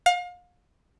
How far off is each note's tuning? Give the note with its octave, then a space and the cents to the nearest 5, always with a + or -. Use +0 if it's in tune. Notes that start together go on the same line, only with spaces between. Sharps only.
F5 +35